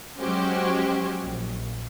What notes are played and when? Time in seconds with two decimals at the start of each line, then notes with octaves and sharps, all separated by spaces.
0.19 F#3 G#3 C#4 F#4 G4 C5
1.22 A#1